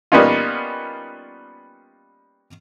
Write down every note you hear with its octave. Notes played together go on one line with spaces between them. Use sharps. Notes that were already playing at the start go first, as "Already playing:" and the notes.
G3 A#3 B3 C#4 D#4 F4